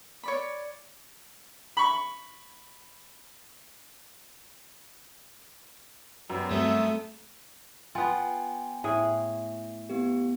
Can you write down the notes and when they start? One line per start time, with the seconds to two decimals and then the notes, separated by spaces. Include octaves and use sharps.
0.23 C#5 D5 B5
1.77 B5 C#6
6.30 F#2 G3 B3
6.51 G2 G3 A3 C4 E5 D#6
7.95 B3 F4 G5 G#5 C6
8.84 A2 G#4
9.90 B3 G4